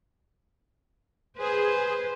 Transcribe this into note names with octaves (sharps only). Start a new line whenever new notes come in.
G#4 B4 C5